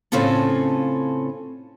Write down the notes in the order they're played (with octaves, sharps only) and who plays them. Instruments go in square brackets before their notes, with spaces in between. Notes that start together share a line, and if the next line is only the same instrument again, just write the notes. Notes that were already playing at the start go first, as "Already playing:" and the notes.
[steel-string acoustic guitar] A2 C#3 C4 C#4 F4 A4